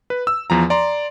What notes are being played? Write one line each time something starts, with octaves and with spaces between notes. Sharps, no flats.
B4
E6
E2 F3 A#5
D5 A#5 C6